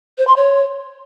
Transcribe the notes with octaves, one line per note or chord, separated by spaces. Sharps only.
C5
C6
C#5